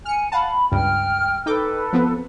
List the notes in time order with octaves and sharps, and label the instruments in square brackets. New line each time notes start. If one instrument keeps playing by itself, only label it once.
[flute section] G#5 [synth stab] F6 C#7
[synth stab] F5 F#5 A5 [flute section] B5
[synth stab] C#2 G2 [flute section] G5 F6
[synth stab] D#4 G5 D6 [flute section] A4 B4
[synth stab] F3 B3 C4